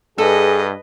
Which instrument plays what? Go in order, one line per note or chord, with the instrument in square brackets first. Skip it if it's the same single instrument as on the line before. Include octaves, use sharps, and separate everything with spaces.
[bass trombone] G2 [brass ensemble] G#4 [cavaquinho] A4 [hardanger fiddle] B4 D#5